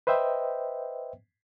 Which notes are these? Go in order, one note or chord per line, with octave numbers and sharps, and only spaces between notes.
B4 C5 D#5 E5 G5